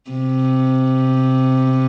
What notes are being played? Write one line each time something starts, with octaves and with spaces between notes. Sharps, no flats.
C3